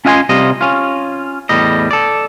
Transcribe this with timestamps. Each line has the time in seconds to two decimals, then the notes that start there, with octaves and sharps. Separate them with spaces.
0.05 C#4 F4 D#5 F5 G#5 C6
0.29 C3 G3 F4 D#5
0.61 C#4 F4
1.49 E2 A2 G3 D#5
1.91 A4 D5